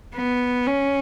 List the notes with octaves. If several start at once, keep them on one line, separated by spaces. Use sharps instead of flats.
B3
C#4